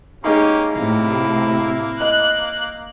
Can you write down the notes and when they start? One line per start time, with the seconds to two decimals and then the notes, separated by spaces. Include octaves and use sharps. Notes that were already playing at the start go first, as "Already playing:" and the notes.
0.24 G#3 A#3 C#4 D#4 G4
0.74 A2 C3 A#3 E4
2.01 D#5 F#6